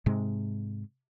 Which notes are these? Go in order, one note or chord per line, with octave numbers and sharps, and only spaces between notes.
G#2 C3 G#3